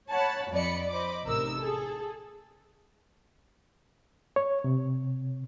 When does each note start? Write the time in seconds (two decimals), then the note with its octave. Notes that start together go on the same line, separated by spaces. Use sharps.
0.12 C#5 F#5 A5 B5
0.52 F2 D5 D#5 B5 C#7
0.90 C5 D#5 B5 D6
1.26 A1 C3 D#4 A#4 E6
1.58 G#4 A4
4.36 C#5
4.64 C3